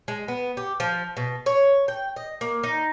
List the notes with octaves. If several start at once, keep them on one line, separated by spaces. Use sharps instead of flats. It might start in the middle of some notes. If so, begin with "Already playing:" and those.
G#3
B3
G4
F3
B2
C#5
G5
D#5
A#3
D#4